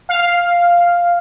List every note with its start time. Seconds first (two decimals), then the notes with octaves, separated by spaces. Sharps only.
0.09 F5